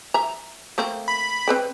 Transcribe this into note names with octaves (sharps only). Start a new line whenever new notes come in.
E5 A#5
A3 A#3 C4
B5
C4 B4 G5